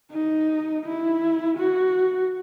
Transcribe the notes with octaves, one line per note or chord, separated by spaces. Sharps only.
D#4
E4
F#4